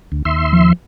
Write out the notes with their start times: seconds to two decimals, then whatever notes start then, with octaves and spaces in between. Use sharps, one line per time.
0.12 D2
0.25 D#2 E5 C6
0.53 F3